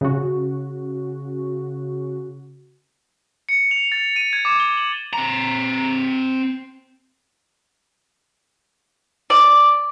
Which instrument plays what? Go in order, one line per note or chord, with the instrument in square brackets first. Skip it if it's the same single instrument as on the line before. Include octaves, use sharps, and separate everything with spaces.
[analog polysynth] C#3 F#4
[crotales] C#7
F7
A6
D#7
G#6
D6
G7
F#7
[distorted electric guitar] C4 A#5
[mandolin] D5